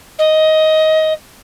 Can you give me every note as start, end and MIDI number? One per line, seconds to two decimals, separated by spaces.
0.18 1.13 75